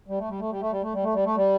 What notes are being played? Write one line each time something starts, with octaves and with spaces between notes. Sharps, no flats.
G3
A3
G3
A3
G3
A3
G3
A3
G3
A3
G3
A3
G3